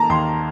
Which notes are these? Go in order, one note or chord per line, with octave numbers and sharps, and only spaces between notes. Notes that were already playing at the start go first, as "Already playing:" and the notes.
Already playing: D#3 A#3 A5 A#5
D#2 C6